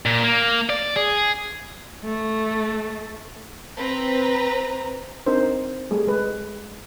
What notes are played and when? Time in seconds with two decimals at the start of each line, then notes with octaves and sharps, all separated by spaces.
0.06 A#2
0.23 A#3
0.69 D5
0.96 G#4
2.05 A3
3.77 C4 B4 C5 A#5
5.26 C4 D4 D#4 A#4 C5
5.91 G3 A3 G#4
6.07 G#3 B4